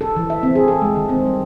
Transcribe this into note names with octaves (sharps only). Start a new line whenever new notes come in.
A4
E3
E5
C4
G#4
A4
G#3
D#3
C4
G3